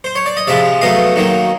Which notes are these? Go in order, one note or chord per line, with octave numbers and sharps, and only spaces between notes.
C5
C#5
D5
D#5
C3 F3 G#3 D5 E5
B2 F#3 A3 D#5 F5
D#3 F#3 A#3